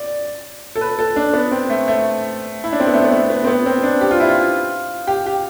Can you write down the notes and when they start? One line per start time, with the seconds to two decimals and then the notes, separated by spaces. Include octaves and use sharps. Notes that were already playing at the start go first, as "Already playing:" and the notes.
Already playing: D5
0.76 A4
0.81 B4
0.99 A4
1.16 D4
1.33 B3
1.51 C4
1.70 A3
1.88 A3
2.64 E4
2.72 D4
2.80 C4
2.87 B3
2.94 A3
3.04 B3
3.12 A3
3.30 B3
3.44 C4
3.47 B3
3.66 C4
3.83 D4
4.01 G4
4.11 F4
4.20 E4
4.29 F4
5.07 G4
5.26 G4